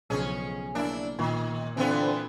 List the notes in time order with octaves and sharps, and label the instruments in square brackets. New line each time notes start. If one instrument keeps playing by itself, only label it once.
[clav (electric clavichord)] B1 C#3 F3 [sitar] C#4 G#4
[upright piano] A#3 [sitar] D4 E4
[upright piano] A#2 [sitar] D#3
[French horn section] D3 C4 [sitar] E3 B3 F4